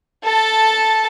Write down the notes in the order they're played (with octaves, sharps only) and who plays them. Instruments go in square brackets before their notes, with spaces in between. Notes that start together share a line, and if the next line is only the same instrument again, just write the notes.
[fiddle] A4 A5